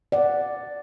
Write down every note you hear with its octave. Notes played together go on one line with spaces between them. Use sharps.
D5 F#5